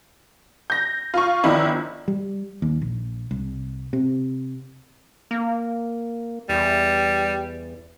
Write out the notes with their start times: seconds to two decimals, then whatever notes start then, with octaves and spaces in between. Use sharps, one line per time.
0.70 G6 A#6
1.14 F4 C#6
1.43 G1 D#3 F3 E4 D5
2.08 G3
2.62 D#2
2.82 A#1
3.31 C2
3.93 C3
5.31 A#3
6.49 E2 G3